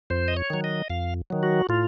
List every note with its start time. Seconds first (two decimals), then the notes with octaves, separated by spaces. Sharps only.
0.10 F2 C5
0.28 D#5
0.37 C#5
0.50 D#3 F#3
0.64 D#5
0.90 F2 F5
1.30 D#3 F#3
1.43 F#4
1.69 A2 F4